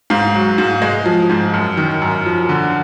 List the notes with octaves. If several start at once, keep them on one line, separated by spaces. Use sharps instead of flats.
G#2 F5
F#3
G#2
G#3
F3
G#2
F#2
D#3
F#2
F3
D3